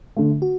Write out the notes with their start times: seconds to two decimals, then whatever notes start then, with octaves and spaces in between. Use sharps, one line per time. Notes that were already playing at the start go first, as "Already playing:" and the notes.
0.17 D3 A3
0.42 F#4